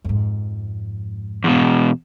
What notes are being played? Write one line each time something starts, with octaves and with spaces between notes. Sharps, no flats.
F2 G#2
E2 B2